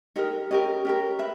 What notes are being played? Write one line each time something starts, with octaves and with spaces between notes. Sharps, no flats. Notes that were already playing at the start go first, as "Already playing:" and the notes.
D#4 G4 A#4 D#5
C#4 G4 A#4 D#5
C#4 G4 A#4
B4 E5